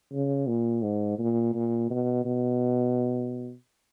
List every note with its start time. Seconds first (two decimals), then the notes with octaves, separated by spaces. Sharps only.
0.12 C#3
0.47 A#2
0.83 G#2
1.18 A#2
1.54 A#2
1.90 B2
2.25 B2